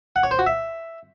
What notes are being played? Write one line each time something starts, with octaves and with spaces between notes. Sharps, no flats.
F#5
C#5
C5
F#4
E5